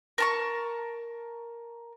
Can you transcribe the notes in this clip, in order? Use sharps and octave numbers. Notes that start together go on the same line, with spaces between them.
A#4 A5 C#6